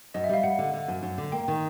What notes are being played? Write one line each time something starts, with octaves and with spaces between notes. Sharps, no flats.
F#2 D#5
E5
G3 F5
G3 F#5
D3
D3
F#2
F#2
D3
A#3 G5
D#3